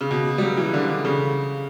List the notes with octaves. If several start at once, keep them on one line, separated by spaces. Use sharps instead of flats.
C#3
B2
G3
F#3
E3
D3
D3
C#3